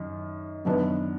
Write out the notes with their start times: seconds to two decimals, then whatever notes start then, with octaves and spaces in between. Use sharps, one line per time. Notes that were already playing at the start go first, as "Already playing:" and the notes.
Already playing: F#2 D#3
0.65 F#2 D#3 F#3 B3 D4